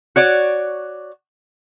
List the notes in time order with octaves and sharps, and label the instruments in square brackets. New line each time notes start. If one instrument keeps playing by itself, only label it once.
[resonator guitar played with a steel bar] F#4 C#5 D5